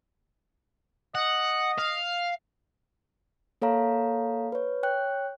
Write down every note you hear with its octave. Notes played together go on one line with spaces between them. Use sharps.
D#5 F#5
F5
A#3 A4 C#5 F5 A#5
B4 C#5
C#5 G5 F#6